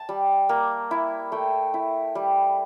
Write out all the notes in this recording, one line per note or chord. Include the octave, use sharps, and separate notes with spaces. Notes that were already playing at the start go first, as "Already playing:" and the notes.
Already playing: A5
G3
A#3
E4
A3 G5
E4
G3